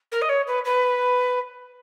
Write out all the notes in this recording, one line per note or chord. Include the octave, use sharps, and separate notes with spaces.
A#4
D#5
C#5
B4
B4